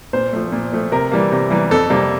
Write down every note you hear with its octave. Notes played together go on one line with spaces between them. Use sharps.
A#2 C5
F3 A3
A#2
F3 A3
C3 A#4
E3 G3 A#3
C3
E3 G3 A#3
F2 A4
C3 G3 A#3